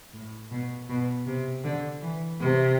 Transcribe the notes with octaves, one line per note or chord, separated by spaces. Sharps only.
A2
B2
B2
C3
D3
E3
C3